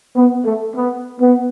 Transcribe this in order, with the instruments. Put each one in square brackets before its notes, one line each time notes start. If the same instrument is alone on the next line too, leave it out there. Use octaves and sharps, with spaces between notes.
[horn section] B3
A3
B3
B3